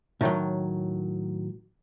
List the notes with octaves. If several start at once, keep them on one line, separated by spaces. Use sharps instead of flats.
A2 D#3 F#3